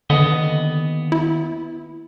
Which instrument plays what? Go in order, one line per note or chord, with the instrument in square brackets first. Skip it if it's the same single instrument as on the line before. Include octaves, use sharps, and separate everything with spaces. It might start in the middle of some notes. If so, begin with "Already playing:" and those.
[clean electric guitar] D#2 B3 D#5 [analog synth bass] D3
[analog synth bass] E4